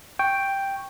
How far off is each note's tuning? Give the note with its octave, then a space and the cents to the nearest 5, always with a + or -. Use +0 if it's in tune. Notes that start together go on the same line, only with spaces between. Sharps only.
G5 +0 C#6 -5